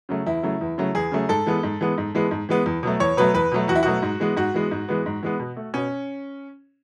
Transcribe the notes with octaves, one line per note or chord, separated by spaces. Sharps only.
C#3 F#3 A3
E2 E4
C#3 F#3 A3
E2
C#3 F#3 A3
E2 G#4
C#3 F#3 A3
G#2 A4
E3 G#3 B3
G#2
E3 G#3 B3
G#2
E3 G#3 B3
G#2
E3 G#3 B3
E2
B2 F#3 A3
E2 C#5
B2 F#3 A3 B4
E2 B4
B2 F#3 A3
E2 F#4
E4
B2 F#3 A3 F#4
G#2
E3 G#3 B3
G#2 F#4
E3 G#3 B3
G#2
E3 G#3 B3
G#2
E3 G#3 B3
B2
A3
B2 C#4